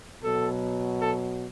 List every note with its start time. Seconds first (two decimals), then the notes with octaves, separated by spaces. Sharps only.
0.24 B2 F#3 A4
1.01 A4